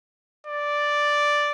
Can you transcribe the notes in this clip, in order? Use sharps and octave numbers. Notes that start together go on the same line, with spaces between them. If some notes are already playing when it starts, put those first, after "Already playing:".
D5